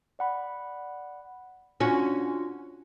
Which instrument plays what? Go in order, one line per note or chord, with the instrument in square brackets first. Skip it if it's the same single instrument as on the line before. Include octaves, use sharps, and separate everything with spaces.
[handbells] D5 F#5 B5
[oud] C#4 F#4 [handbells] D4 F4 A#6